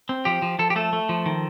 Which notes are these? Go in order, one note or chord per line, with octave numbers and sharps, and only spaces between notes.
C4
F3 G4
F3
F3 A4
G4
A3 A4
A3
F3
D#3